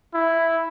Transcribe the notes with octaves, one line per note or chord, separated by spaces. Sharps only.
E4